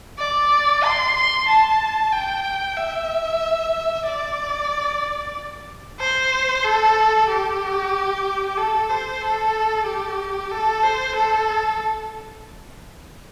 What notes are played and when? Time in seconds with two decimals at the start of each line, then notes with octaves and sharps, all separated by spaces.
0.19 D5
0.85 C6
1.16 C6
1.48 A5
2.13 G5
2.77 E5
4.06 D5
6.00 C5
6.65 A4
7.29 G4
8.57 A4
8.90 C5
9.22 A4
9.86 G4
10.51 A4
10.83 C5
11.15 A4